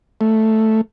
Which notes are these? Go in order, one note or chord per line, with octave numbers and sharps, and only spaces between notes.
A3